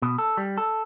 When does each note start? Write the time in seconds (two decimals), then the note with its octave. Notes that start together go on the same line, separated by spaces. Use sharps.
0.02 B2
0.18 A4
0.37 G3
0.58 A4